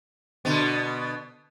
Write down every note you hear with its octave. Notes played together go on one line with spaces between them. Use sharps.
B2 D3 B3